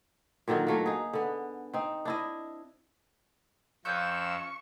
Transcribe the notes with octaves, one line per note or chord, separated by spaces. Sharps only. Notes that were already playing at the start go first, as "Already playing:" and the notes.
A#2 D3 D#3 F#3
F#3 A3 A#3
D#4 G#4
D3 B3
C4 D#4
D4 E4 D#5
F2 F3 C#4 F5 C#6 E6 F#6 G6